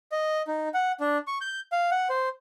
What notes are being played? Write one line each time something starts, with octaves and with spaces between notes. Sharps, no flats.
D#5
D#4
F#5
D4
C#6
G6
F5
F#5
C5